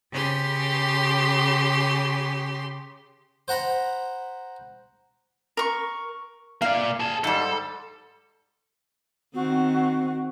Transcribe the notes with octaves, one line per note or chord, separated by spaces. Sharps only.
C#3 G4 C6
C5 F#5 A#5 B5
A#4 C#6
A#3 D5 F5
G#4 A5
G#2 G3 A4
D#3 C4 F#4